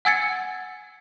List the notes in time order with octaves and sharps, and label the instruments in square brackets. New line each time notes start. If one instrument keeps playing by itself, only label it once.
[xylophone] F#5 G#5 E6 G#6 A6 C#7